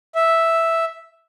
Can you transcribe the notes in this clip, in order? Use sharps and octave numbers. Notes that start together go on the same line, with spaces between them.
E5